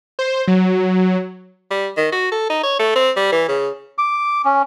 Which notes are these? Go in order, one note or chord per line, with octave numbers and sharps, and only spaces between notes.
C5
F#3
G3
D#3
F#4
A4
D#4
C#5
A3
C4
G3
E3
C#3
D6
C#4